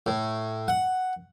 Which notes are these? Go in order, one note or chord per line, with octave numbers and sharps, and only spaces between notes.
A2
F#5